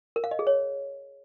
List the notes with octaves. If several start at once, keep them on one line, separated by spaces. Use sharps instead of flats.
A#4
F5
D#5
G#4
C#5